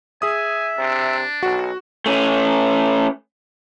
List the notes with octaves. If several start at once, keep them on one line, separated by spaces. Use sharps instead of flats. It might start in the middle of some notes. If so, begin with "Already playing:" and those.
G#4 E5 G#5 D#6
C3 D4
B1 F#4
A3 C#4